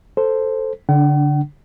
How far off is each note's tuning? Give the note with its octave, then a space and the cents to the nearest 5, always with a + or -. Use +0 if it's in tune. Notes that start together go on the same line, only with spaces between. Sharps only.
A4 +5 C5 +0
D3 -25 D4 +0 F#5 +45